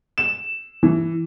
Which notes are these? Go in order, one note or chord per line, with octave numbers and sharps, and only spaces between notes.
E7
E3